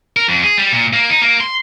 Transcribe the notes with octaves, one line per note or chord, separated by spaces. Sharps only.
A#4
F2
G#4
G3
A#2
A#3
D#4
A#3
C6